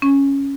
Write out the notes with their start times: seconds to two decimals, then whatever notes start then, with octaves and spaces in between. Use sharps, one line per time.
0.02 C#4